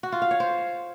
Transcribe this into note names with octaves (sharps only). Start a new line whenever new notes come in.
F#4
F4
F5
C#5
C5